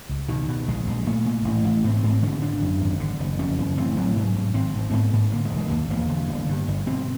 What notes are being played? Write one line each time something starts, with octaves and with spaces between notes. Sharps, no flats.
C#2
B2 D#3
B2
A#1 G#3
A#1 G#3
A#2 A3
A#2
A1
A1
G#2 C4
C4
G#2
C4
D3 C#4
G#1 D4
F#2
G#1
D3
F#1
F2 C#4
F#1
A1 C4
A1 F#3
G#2 F#3
G#2
G#1 C4
G#1
G#2 B3
G#2
D3 A#3
G#3
E1
G#3
D#2 A#3
E1 A#3
D3
G1
G2
G1
B2 C4